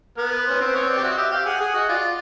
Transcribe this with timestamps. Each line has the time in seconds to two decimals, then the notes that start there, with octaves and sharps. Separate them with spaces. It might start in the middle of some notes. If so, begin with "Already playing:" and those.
0.17 B3 A#4
0.32 B4
0.46 C#4 C5
0.61 C4 C5
0.72 B3 C#5
0.82 C4
0.89 D5
0.98 G4
1.03 F#4 E5
1.11 D#5
1.17 G4 E5
1.32 G4 F5
1.46 G#4 F#5
1.61 G#4 F#5
1.74 F#4 D#5
1.89 F4 D5